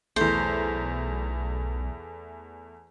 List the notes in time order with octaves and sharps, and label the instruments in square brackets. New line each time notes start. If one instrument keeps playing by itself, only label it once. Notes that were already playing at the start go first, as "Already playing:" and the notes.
[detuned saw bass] B1 [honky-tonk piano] E2 A3 [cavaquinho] C5